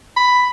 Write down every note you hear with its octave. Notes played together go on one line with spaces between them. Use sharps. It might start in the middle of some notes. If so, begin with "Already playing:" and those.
B5